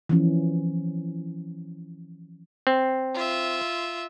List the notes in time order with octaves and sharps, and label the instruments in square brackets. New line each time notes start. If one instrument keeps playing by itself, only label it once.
[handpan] E3 F3 C#4
[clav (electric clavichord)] C4
[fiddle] F4 E5